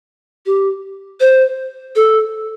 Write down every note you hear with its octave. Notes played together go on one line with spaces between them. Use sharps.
G4
C5
A4